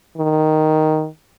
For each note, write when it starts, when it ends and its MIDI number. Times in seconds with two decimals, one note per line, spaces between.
0.17 1.07 51